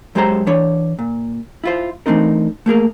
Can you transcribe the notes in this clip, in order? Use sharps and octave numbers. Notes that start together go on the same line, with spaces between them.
F#2 G#3 G4 A4 C5 A#5
E3 D4 C#5
A#2
E4 F4 C5
E3 A3 C4 D4 D#4 A#4
A3 A#3 G#4 A#4